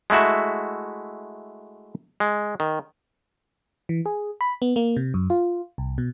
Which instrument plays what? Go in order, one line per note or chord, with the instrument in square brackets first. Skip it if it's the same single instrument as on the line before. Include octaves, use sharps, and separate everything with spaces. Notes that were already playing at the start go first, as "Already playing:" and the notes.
[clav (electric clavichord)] G#3 A3 E4 F#4 E5
G#3
D#3
[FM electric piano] E3
G#4
B5
B3
A#3
C3
F#2
F4
C2
B2